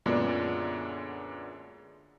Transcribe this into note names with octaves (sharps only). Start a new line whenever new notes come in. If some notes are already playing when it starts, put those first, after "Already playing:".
F#2 A#2 D3 G#3 B3 D4